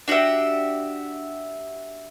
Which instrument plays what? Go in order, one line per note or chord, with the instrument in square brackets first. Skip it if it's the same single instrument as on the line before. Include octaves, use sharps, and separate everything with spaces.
[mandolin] D4 F#4 G4 E5